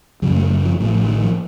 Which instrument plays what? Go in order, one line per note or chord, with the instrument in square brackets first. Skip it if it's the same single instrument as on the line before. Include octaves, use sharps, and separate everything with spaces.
[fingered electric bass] F#1 F#2 C#3 F3
A3
F#3
F3
A1 A2 F3
F3
D#3
F3